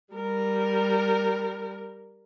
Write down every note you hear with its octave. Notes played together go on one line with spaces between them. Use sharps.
G3 A#4